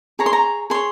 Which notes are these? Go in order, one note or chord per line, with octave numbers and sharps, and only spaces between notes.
G#4 C#5 A#5
C6
A#5
G#4 C#5 C6